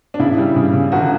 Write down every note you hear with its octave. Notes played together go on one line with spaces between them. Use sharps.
D4
C#3 E4
G3
C#3
C#3
G1 F#4